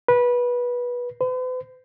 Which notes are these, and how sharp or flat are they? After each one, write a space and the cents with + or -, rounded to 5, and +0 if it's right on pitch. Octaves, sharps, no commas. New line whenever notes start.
B4 -20
B4 +45